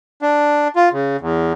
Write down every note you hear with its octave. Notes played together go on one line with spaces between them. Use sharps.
D4
F4
C#3
E2